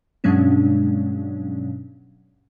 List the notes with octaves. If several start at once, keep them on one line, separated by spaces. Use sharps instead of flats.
G2 B2 F#3 G#3 C#4 D4